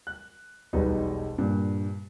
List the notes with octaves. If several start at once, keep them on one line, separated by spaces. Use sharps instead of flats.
F#6
E1 B1 B2 G3 D#4 B4
G2 A#2